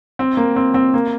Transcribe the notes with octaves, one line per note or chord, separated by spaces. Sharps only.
C4
A#3
C4
C4
A#3